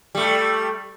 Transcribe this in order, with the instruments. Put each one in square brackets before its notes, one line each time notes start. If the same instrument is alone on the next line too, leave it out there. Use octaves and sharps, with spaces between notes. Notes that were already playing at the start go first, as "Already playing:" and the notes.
[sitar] G3 A3